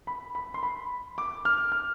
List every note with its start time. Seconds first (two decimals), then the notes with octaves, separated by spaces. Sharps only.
0.07 B5
0.35 B5
0.54 C6
0.63 B5
1.18 D6
1.45 F6
1.72 F6